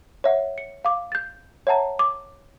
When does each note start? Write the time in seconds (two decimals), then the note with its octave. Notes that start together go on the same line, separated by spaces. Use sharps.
0.24 C#5 E5 F#5
0.58 C#7
0.85 F5 D6
1.12 G6 A6
1.67 C#5 E5 F#5 A5 A#5
1.99 D6